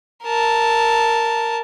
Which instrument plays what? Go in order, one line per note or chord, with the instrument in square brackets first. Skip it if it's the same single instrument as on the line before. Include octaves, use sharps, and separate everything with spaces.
[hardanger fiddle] A#4 A5